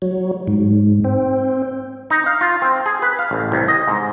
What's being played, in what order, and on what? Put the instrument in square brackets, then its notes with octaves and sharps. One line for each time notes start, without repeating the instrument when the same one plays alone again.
[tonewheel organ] F#3
G#2
C4
[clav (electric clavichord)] D#4
F5
F4
C4
G#4
B4
F5
A1
C2
D#5
G#2